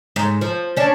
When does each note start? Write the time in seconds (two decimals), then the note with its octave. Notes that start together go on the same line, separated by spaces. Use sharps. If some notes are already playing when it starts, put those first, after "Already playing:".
0.16 G#2
0.41 F3
0.77 C#4 D4